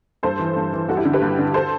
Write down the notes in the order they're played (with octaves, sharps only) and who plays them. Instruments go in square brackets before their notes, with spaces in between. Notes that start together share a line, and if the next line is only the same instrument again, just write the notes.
[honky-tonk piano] G2 A4 C5
E3
G2
E3
G2 F#4 A4
E4 G4
D3
G4 B4
G2
D3
A4 C5